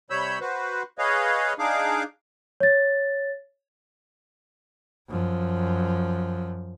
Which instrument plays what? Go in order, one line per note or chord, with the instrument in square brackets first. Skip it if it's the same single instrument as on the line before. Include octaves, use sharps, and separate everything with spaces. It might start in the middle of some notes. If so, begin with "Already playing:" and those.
[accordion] C3 G3 C#5 B5 E6 G6
F#4 B4 C5
G#4 B4 C#5 D#5 F5
D4 D#4 G#4 F5 D6
[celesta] C#5 A6
[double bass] F#2 F3